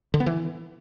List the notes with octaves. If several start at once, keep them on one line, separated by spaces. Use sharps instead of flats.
D3
B3
E3